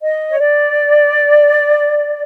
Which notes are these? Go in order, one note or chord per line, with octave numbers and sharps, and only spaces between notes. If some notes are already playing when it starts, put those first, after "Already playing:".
D#5
C#5
D5